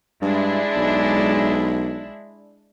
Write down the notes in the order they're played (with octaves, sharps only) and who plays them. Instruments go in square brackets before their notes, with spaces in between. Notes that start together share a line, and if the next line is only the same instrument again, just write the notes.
[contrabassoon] G2 [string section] G#3 D4 E4
[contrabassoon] B1